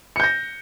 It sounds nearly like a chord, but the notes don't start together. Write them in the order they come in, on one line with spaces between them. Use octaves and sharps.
C#7 G6 A#6